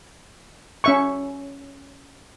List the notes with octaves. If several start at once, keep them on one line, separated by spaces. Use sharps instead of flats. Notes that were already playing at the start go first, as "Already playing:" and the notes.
C#4 E5 C#6